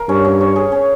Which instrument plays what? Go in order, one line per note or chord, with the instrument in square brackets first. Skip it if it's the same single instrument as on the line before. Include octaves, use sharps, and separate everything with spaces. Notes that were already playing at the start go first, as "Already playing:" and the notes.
Already playing: [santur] A#4 F5
[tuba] G2 [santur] C#4
[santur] C#4
C#5
G#4
C#4